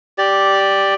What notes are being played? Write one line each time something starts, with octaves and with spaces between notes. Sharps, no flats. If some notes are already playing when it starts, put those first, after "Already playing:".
G4 D5